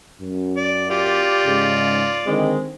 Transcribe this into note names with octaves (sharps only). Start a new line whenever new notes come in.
F#2
D5
F4 G4 D5
G#2 C#3
D3 D#3 G#3 C4